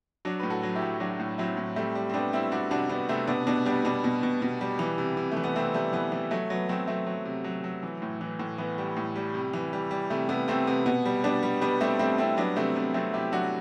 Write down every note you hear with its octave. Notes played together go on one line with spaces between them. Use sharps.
F#3 D4 F#4
A2 B4
F#4 A4
F#3
E4 G4
F#3
F#3 D4 F#4
A2
F#3 C4 E4
A2
G3 A3 C4
G3
C4
G3 B3 D4
G3 C4 E4
G3 D4 F#4
C3 D4 F#4
C3 B3 D4
C3 A3 C4
B2 B3 D4
B2 B3 D4
G3 B3 D4
B2 B3 D4
B2
B2
B2
G3
E3
C3
C3
A3
E3
B3
C3 A3 C4
G3 A3
E3 B3
E3 B3
F#3 A3
F#3 B3
F#3 A3 C4
F#3 A3 C4
F#3
C3
F#3
F#3
E3
A2
E3
A2
E3 B3
G3
A2
G3
C3
E3
G3
G3
C3 A3
C3 B3
C3 A3 C4
C3 B3
B2 B3
G3
G3 B3 D4
G3
G3 B3 D4
G3 A3 C4
G3 A3 C4
G3 C4 E4
F#3 B3 D4
C3 A3 C4
C3 B3
F#3 A3 C4
C3 E4 G4
F#3 D4 F#4